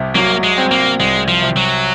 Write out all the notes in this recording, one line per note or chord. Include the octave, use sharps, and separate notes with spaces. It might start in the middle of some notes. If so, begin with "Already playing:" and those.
Already playing: C2 C3
F#3 A#3
G#3
C4
A#3
C2 G#3
F3
C3
F#3